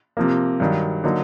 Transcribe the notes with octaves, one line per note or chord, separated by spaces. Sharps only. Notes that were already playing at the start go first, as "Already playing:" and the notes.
C3 F3 A#3
G2 D#3 F#3
D3 F#3 A#3 D#4